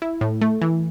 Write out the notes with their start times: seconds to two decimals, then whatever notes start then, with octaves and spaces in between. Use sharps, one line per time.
0.02 E4
0.21 A2
0.41 A3
0.62 E3